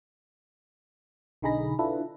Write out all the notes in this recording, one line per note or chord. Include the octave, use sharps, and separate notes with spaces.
B1 D3 D#4 G#4 B5 A#6
D4 E4 F4 A4 B4